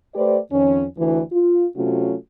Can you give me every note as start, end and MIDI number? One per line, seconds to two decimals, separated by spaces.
0.15 0.38 57
0.15 0.38 67
0.15 0.38 71
0.15 0.38 72
0.15 0.38 74
0.52 0.85 41
0.52 0.85 51
0.52 0.85 61
0.98 1.21 38
0.98 1.21 52
1.32 1.67 65
1.76 2.15 48
1.76 2.15 54
1.76 2.15 57
1.76 2.15 61
1.76 2.15 65
1.76 2.15 66